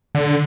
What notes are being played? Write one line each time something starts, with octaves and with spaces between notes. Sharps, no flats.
D3